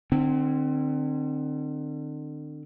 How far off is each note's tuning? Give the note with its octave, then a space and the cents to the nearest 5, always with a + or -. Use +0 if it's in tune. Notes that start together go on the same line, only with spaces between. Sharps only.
D3 +40 C4 +0